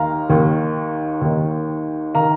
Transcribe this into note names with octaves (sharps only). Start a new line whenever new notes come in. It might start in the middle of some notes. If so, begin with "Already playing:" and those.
Already playing: D#2 D#3 F5 A#5
D#2 D#3
D#2 D#3
D#3 F5 A#5